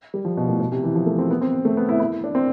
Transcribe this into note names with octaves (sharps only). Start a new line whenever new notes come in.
G3
F3
B2
A2
B2
C3
E3
F3
A3
C4
B3
C4
A3
B3
E4
E4
D4
C4